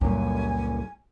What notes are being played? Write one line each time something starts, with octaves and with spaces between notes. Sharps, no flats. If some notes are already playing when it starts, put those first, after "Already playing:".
C#2 F#2 A#2 G3 G#5